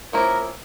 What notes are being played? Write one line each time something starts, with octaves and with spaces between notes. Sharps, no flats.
F3 A#3 C#4 E4 A#4